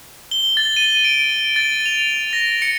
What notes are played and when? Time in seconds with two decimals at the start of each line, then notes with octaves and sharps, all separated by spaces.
0.31 G7
0.57 A6
0.77 D#7
1.04 D7
1.56 A6
1.86 F7
2.33 A#6
2.62 C#7